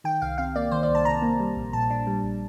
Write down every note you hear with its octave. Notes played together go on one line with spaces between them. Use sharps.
D#3 G5
C2 F5
C3 F5
A#3 D5
D#3 C5
D5
C2
A5
C3 A#5
A#3
G3
A#1
A#2 A5
D4
G3
A#1